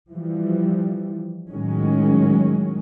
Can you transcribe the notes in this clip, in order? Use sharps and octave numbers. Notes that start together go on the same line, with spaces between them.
E3 F3 G3
A2 D#3 F#3 G#3 C#4